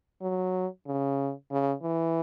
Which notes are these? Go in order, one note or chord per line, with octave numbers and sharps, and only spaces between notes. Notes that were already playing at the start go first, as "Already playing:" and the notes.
F#3
C#3
C#3
E3